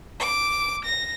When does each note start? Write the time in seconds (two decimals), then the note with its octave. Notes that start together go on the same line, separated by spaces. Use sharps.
0.20 D6
0.85 A#6